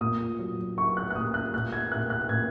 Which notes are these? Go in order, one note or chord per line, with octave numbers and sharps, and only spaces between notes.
A#2 D#6
F#3
F#3 C#6
F#6
F#6
A#2 D#6
F#6
A#2 F#6
G#6
A#2 F#6
F#6
A#2 G#6